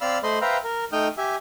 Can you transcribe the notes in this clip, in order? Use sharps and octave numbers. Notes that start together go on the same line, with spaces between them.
C4 D5 F5 B5 E6 F6
A3 C5 D#5 B5 C6
B4 C5 E5 F5 G5 A#5
A#4
A3 D#4 G5 D#6 F6 G6
G4 E5 G#5